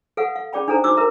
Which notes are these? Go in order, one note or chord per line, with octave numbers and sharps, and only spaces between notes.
A4 B4 F5 F#5
F5
C#4 G#4 D5 G5 B5
D4 D#4 A4 C5 A#5
D#4 F#4 C5 D6 E6
A#4 B4 E5 A#5